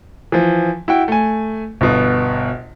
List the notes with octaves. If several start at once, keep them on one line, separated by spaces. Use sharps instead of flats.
E3 F3
E4 F#4 G5
A3 G#5
G1 B2